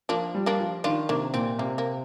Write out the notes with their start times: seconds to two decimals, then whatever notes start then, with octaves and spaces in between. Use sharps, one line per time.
0.09 F3 A#3 D4
0.35 G3
0.46 A#3 D4
0.59 F3
0.84 D#3 D4 F4
1.09 C3 A#3 D4
1.34 A#2 C4
1.58 C3 A#3
1.78 A#3